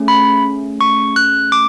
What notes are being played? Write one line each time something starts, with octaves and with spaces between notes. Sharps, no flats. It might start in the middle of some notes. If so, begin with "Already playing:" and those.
Already playing: A3 C#4 G#4
B5
C#6
F#6
D6